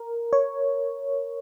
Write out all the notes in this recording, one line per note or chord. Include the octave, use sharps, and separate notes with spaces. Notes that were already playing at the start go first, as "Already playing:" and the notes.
Already playing: A#4
C#5